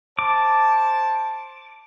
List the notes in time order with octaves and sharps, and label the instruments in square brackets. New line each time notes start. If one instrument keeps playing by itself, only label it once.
[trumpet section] C5 A5 [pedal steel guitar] D6